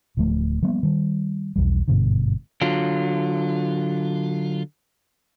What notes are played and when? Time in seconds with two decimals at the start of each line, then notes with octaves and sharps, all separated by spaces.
0.17 D1 D2 F3 A3
0.62 F3 G3 A#3 B3
0.83 D#3 G3
1.56 B1 E2 G3
1.88 G#1 G2 B2 D3
2.61 D3 F#3 F4